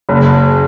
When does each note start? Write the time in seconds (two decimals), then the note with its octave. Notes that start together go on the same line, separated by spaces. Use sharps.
0.09 F#1